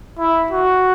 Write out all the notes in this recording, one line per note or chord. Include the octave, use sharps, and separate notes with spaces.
E4
F#4